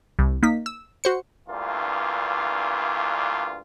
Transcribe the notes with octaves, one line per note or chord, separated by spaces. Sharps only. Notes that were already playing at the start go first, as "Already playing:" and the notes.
C2
A#3 D#4 B6
E6
F#4 C5 C#7
D2 G2 E3 A#3 F4